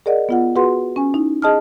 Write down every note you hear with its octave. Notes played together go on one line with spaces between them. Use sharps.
G#4 A#4 D5 D#5 F#5
B3 F4 F#5
F#4 G#4 B4 F#5 C6
C#4 G#5
D#4 E4
G#4 D#5 A5 D#6 F6